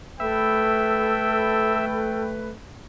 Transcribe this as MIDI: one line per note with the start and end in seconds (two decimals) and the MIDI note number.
0.20 2.49 57
0.20 2.23 69
0.20 2.49 71
0.20 1.85 76
0.20 2.33 79